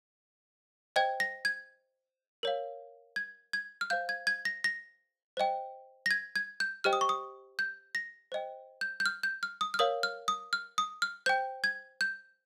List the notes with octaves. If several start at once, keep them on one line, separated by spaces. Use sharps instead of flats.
C5 D#5 G5 G#6
A#6
G#6
A#4 C#5 F5
G#6
G#6
F6
C5 F5 G6
G#6
G#6
A#6
A#6
C5 D#5 G5
A#6
G#6
G#6
G6
G4 C5 D#5 G5 F6
D#6
C#6
D#6
G6
A#6
C5 D#5 G5
G6
G6
F6
G6
F6
D#6
F6
A#4 C#5 F5 D#6
F6
D#6
F6
D#6
F6
C5 G5 G6
G#6
G6